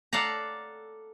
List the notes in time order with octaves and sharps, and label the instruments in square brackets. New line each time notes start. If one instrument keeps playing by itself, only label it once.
[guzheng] A4 D5 F5 F#5 A#5